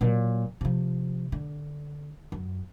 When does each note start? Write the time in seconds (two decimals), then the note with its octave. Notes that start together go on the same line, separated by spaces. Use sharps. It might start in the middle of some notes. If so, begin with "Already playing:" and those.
0.01 A#2 F#3
0.61 C3 F3
1.32 D3
2.32 F#2